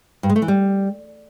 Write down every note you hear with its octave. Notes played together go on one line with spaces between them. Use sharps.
G2
G#3
A3
E3
G3